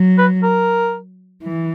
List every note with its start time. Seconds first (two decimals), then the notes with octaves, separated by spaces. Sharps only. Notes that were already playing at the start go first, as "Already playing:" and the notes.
Already playing: F#3
0.18 B4
0.43 A#4
1.43 E3